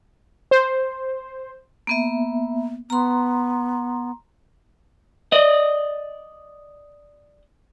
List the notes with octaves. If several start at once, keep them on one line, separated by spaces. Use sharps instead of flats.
C5
A#3 B3 E5
B3 A#5 C6
D5 D#5